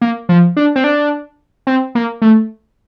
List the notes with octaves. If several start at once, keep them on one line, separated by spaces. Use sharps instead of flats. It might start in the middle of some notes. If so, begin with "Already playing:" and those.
A#3
F3
D4
C4
D4
C4
A#3
A3